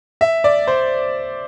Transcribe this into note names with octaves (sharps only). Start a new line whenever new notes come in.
E5
D5
C5